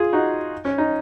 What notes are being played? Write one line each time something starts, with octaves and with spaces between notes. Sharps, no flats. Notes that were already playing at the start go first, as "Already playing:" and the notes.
Already playing: F4 G#4
D#4 F#4
C#4
D#4